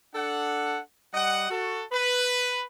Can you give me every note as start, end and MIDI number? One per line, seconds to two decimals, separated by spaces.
0.15 0.79 62
0.15 0.79 69
0.15 0.79 78
1.14 1.46 55
1.14 1.46 75
1.14 1.46 78
1.50 1.83 66
1.50 1.83 69
1.92 2.62 71